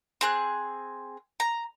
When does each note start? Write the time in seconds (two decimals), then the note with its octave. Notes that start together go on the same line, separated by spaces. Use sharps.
0.21 C4 G#4 F#6
1.40 A#5